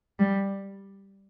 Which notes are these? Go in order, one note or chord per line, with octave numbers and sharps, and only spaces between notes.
G3